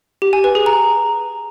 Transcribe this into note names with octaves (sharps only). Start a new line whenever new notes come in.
G4
G#5
B4
G#4
A#5